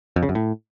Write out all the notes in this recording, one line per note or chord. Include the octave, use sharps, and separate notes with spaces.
F2
C#3
F#2
A2